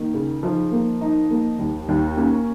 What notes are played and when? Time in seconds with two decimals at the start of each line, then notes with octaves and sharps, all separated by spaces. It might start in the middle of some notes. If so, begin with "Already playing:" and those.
Already playing: D#3 A#3
0.14 C#3
0.43 F3 D#4
0.72 A#3
1.01 D#4
1.30 A#3
1.59 D#2
1.88 D#2
2.17 A#3 C#4